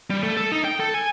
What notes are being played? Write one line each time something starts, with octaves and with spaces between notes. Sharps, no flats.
G3
A3
A4
D#4
G5
A4
G#5